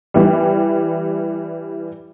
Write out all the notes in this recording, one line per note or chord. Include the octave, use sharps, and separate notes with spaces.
E3 G3